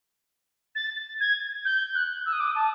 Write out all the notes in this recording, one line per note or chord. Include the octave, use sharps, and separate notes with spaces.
A6
G#6
G6
F#6
E6
D#6
D6
D#6
A5